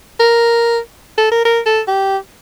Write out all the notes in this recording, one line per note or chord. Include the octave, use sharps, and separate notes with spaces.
A#4
A4
A#4
A#4
A4
G4